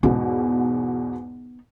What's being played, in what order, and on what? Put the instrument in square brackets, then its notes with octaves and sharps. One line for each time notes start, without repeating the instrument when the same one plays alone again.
[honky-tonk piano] E2 G#2 B2 [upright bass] B3 D#4